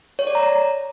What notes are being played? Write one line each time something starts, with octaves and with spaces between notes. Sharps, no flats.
C#5
D5
A#5